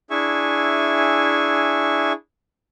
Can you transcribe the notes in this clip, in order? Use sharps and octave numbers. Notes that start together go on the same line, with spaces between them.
D4 E4 G#4 E5 G#5 C#6